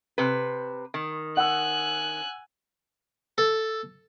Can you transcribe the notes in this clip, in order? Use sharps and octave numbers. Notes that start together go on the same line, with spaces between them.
C3 B4
D#3
F#5 G#5 E6 F#6
A4